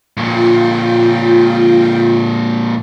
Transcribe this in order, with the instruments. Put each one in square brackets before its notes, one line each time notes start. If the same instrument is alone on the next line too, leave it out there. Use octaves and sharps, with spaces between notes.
[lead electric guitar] F2 A#2 [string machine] F4 G5